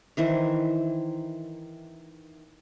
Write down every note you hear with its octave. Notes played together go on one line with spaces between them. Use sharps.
D#3 E3 C5